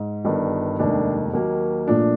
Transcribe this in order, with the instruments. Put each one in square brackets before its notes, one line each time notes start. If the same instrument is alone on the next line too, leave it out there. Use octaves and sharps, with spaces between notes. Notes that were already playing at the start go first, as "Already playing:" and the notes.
Already playing: [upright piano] G#2
G1 G2 D#3 G3
F1 D#2 D#3 G#3 D4
D#2 D#3 F#3 A#3
A#1 A#2 F3 A3 D4